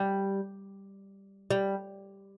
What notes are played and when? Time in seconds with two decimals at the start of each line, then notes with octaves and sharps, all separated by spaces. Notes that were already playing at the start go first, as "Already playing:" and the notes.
Already playing: G3
1.51 G3